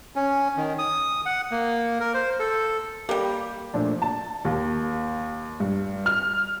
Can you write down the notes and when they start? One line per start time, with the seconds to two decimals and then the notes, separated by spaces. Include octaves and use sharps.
0.16 C#4
0.57 D#3
0.79 D#6
1.26 F#5
1.51 A#3
2.00 A#4
2.14 C5
2.40 A4
3.09 G3 A#3 G4
3.74 A#2 F3 A3 D4
4.02 A5
4.45 D#2
5.60 G2
6.06 F6